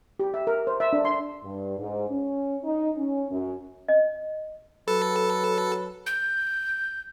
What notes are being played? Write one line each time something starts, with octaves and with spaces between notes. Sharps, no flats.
G4
E5
A#4
C5
E5
D4
C6
G2
G#2
C#4
D#4
C#4
F#2
D#5
F#3 A4 B4
G6